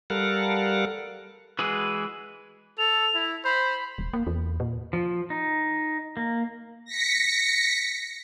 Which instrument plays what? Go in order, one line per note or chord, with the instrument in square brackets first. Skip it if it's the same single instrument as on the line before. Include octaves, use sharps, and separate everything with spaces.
[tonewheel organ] G3 A4 A#4 F5 F#5
[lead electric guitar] E3 G#3 [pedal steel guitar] F#4 G#4 B4
[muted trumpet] A4 [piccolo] F7
[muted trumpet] E4
[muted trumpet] C5 [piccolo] B5
[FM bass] D#1
A#3
E2
A#2
[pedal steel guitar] F3
D#4
A#3
[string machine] A#6 B6 C#7